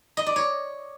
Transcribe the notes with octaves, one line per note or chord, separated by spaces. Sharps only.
D#5
D5
C#5